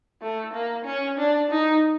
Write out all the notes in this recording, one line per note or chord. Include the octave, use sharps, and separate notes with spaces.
A3
A#3
C#4
D4
D#4